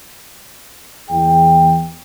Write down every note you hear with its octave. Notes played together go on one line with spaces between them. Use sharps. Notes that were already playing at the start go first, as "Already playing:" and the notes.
E2 G#4 G5